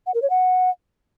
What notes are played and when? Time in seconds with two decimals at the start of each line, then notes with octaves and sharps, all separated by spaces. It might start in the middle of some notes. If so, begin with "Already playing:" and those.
0.06 F#5
0.14 A#4
0.22 C#5
0.30 F#5